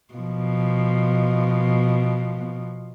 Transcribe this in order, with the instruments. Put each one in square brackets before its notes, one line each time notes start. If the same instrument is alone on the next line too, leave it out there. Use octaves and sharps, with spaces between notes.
[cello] B2 F3